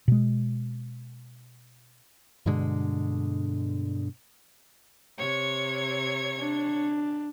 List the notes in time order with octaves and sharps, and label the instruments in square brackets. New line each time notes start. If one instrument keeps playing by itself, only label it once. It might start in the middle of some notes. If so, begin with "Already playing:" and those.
[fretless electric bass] B2 G#3
[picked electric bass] G2 B2 D3 G#3
[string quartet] C3 C#5 G#6
[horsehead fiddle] D4